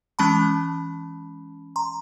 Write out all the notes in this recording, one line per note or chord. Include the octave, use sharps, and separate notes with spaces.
E3 G#3 C#4 A5 B5
A#5 C6